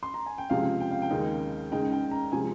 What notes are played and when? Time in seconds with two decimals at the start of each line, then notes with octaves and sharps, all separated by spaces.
0.03 C6
0.14 A#5
0.26 G#5
0.38 G5
0.50 C#2 C3 F3 G#3 F5
0.80 G5
0.91 F5
1.02 G5
1.11 D#2 C#3 G#3 D#4
1.72 C#2 C#3 G#3 D#4 G5
1.92 G5
2.11 A#5
2.32 C3 F3 G#3 G#5